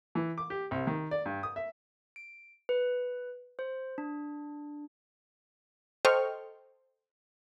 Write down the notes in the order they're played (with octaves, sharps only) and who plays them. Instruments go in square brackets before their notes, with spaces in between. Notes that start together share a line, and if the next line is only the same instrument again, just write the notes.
[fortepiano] E3
D6
G4
C2
D#3
D5
G2
D#6
E5
[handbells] D7
B4
C5
D4
[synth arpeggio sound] A4 C5 D#5 G5 C#6 F6